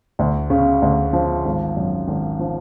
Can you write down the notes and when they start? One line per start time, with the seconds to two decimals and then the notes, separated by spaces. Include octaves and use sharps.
0.19 D2
0.50 C#3
0.82 D2
1.13 F3
1.45 G#1
1.77 F#2
2.08 G#1
2.39 F3